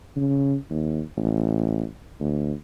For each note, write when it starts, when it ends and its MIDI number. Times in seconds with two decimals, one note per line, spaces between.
0.17 0.56 49
0.70 1.01 39
1.17 1.84 33
2.20 2.54 38